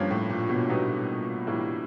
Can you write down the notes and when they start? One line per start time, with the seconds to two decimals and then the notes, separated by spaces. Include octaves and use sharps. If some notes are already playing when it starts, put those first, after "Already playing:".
Already playing: G2 F3 A#3 C#4
0.11 A2
0.30 A#2
0.49 B2
0.69 F#3 B3 D#4 G4
1.46 A2 E3 G3 A#3